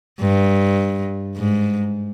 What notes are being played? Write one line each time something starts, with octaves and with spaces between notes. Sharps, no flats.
G2
G#2